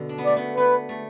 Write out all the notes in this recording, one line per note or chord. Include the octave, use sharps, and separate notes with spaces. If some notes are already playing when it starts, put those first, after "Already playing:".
Already playing: B2 D3
D4
B3
A3 D5
B3
B3 B4
A3